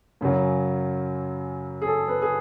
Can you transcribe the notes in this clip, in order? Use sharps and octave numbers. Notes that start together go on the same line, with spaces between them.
F#2 C#3 F#3
G#4
A4
B4
G#4